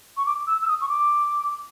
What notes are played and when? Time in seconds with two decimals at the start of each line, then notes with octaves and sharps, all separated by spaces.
0.17 C#6
0.26 D6
0.47 E6
0.61 E6
0.68 D#6
0.81 C#6
0.89 D6